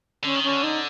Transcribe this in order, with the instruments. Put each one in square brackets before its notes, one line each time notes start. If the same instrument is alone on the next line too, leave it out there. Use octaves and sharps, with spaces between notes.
[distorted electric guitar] D3 [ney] C#4
[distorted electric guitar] D#3
[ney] C#4
[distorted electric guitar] D3
[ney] D#4